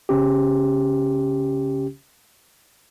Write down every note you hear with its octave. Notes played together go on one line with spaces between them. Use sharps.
C2 C#3 C#4 G4